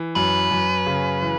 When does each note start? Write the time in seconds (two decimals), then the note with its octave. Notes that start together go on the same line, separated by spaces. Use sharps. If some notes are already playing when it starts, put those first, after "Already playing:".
Already playing: E3
0.15 F#2 B4
0.51 F#2
0.86 C#3
1.23 E3